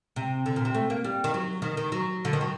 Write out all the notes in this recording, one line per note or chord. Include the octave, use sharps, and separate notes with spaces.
C3
D3
A#2
C3
A3
A#3
G3
D#3
F#3
D#3
D#3
F#3
D3
D#3
F#3